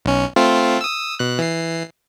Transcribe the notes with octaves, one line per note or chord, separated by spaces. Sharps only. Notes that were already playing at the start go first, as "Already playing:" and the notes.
B1 C#4
A3 C4 F4
D#6 E6
B2 F#6
E3 C7